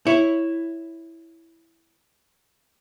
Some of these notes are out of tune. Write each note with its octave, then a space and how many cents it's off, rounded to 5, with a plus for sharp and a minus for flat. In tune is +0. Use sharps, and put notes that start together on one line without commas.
E4 +0 C#5 +0